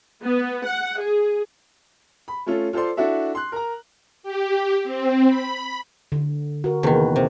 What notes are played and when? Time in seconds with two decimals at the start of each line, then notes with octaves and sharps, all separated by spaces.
0.24 B3
0.66 F#5
1.00 G#4
2.28 B5
2.47 A3 C#4 F4 A4
2.73 F4 A4 C5 D5 C6
2.97 D4 E4 F#4 A4 E5
3.35 C6 F#6
3.52 A#4 A#5
4.23 G4
4.84 C4
5.27 B5
6.12 D3
6.64 F#4 A#4
6.83 E2 C3 D#3 A#3 B4
7.16 C3